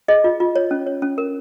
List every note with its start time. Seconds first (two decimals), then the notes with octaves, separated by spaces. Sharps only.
0.08 G#4 D#5
0.24 F4
0.40 F4
0.56 C#5
0.71 C#4
0.87 C#5
1.02 C#4
1.18 A#4